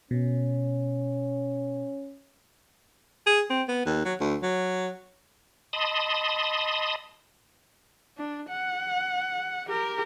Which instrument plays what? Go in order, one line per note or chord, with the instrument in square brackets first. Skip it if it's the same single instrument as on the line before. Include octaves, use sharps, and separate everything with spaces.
[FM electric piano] B2 [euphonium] C#4
[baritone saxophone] G#4
C4
B3
D#2
F#3
D2
F#3
[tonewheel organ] D#5 A5 B5 C6 D#6
[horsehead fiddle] D4
F#5
G4 A#4